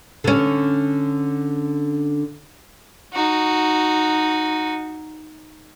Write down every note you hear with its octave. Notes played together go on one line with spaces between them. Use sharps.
D3 C#4
D#4 F#4